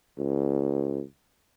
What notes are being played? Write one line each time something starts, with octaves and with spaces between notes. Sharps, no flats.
C#2